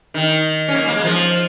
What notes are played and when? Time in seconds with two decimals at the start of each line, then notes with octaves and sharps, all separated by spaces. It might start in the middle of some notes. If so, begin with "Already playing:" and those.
0.14 D#3
0.68 C#4
0.74 A#3
0.88 A#3
0.96 G#3
1.04 F3